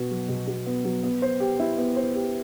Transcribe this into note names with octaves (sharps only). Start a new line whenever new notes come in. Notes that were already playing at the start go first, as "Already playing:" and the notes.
Already playing: B2 B3 F#4
F#3
B2
F#4
B3
F#3
B3
C5
G4
E4
B3
C5
G4